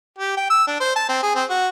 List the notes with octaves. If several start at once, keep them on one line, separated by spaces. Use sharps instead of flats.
G4
G5
E6
D4
C5
A5
C4
G#4
C4
F#4